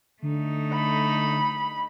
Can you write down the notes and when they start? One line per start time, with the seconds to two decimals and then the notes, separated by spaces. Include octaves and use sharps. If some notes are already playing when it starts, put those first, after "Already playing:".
0.23 D3 A3 D#4
0.74 B5